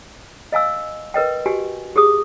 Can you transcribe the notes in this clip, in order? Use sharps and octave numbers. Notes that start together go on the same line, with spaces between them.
D#5 F5 G#5 E6
A#4 B4 D#5 G5
F#4 G4 G#5
G4 G#4 D#6